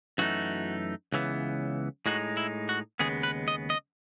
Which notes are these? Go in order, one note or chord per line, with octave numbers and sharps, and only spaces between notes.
F#2 E3 A3 D#4 F#4
C#2 C#3 E3 B3
A2 G#3 D#4 F#4
E4
F#4
D#2 C#3 G#3 B3 G#4
B4
D#5
D#5